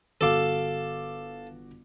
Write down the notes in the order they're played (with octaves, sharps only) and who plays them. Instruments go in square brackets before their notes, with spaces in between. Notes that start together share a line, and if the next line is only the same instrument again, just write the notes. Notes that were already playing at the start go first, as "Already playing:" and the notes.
[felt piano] G1 F#4 D6 [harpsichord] A4 F5